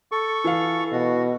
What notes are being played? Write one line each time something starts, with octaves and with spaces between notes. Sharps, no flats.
A4 C#6
E3 F5
B2 F#4